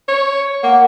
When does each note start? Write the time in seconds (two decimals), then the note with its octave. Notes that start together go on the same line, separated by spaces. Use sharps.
0.08 C#5
0.63 A#3 F#5